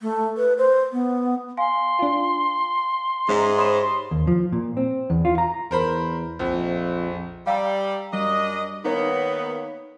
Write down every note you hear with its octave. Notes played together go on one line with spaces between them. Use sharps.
A3
B4
C5
B3
F5 G#5 C6
D4 F4
G#2 G#3 C#4 E5 A#5
C5 C#5 B5 D#6 E7
G4 C6
D#2
F3
A#2
C4
E2
F4
A#5
E2 A#4 C5 B5
A#1 F2
G3 F5 A#5 E6
F#2 G3 D4 D#5
D#3 A#3 B3 D#4 A#4 C#5